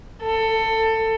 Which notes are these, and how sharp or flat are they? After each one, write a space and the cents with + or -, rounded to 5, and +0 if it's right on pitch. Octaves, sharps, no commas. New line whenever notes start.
A4 +20